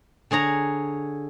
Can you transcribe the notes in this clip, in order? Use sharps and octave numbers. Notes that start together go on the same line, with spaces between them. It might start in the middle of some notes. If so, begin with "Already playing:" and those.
D3 G#4 C#5 A#5